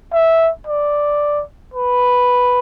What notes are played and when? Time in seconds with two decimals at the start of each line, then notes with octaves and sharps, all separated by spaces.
0.13 E5
0.67 D5
1.74 B4